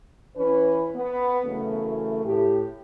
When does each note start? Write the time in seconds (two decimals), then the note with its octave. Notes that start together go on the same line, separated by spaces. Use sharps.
0.36 E3 C#4 B4
0.95 B3
1.45 F#2 C#3 E3 A3
2.25 A2 G4